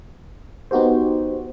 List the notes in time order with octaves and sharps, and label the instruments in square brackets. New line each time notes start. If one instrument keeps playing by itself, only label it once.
[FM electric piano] B3 D#4 F#4 G4 C5